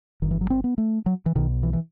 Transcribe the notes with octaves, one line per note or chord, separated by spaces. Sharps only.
G1 G2 D#3
E3
F#3
C4
B3
A3
F#3
E3
B1 B2 D#3
E3
E3